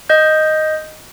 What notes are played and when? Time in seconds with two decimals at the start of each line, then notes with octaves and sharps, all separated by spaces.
0.09 D#5 G6